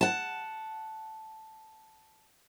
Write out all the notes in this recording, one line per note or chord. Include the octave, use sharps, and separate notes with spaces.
F#5 A5